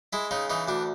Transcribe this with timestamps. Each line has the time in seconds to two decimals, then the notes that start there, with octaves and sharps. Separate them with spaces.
0.13 G#3 E4
0.31 C#3 D#4
0.50 E3 D#4
0.68 D2 D4